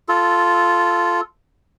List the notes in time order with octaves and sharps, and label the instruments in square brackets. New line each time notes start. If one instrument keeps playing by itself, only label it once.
[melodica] F4 A4